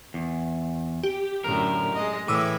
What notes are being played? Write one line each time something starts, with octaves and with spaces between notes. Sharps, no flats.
E2
G4
F#2 A2 D3 A#4
G#3 D#5
A2 E3 D6 E6